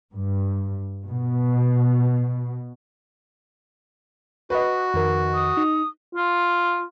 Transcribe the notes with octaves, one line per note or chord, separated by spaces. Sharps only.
G2
B2
F#4 B4 D#5
F2 D#3 A#4
D#6
D#4
F4